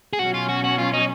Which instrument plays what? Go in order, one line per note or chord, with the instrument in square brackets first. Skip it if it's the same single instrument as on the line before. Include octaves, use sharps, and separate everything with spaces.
[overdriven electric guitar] G#4
[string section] B2 F#3 C#4 [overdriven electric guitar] F#4
[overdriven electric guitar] F4
F#4
F#4
F4
D#4